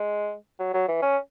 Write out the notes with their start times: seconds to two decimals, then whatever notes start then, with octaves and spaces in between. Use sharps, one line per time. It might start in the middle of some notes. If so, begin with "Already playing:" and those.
Already playing: G#3
0.59 F#3
0.74 F#3
0.88 E3
1.02 C#4